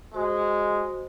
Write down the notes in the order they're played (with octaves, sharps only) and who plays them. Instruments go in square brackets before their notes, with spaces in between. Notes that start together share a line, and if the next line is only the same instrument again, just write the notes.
[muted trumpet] G#3 [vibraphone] F#4 C5